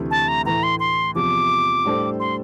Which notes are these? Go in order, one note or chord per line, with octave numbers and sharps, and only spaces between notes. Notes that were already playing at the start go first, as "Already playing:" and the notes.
Already playing: D2 C3 E3 A3
A5
A#5
A2 E3 A3 A#5
C6
C6
E2 C3 F3 D6
A2 G3 D4 A4 C5
C6